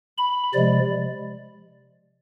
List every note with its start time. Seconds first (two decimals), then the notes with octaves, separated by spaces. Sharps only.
0.17 B5
0.54 C3 F3 G#3 D5